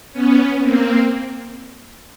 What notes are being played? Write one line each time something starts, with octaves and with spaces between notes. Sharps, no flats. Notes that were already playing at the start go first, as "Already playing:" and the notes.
B3 C#4
A#3 C4